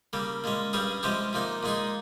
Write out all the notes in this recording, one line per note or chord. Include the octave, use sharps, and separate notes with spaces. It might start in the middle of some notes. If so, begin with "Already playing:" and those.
C#3 G3 A#3
A#2 G#3 C#4
G2 G3 C#4 G#4
C3 F3 G#3 C#4 G4
C3 F3 A#3 D#4
A#2 G#3 D#4 G#4